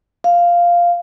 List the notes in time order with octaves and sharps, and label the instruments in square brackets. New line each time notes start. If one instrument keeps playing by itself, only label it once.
[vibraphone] F5